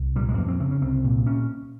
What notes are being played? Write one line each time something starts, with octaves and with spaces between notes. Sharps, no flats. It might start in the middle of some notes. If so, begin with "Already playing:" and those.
Already playing: C2
A#2 G3
G#3
F2 A#3
C4
C#3 C4
C#4
C2 C4
A#2
C#4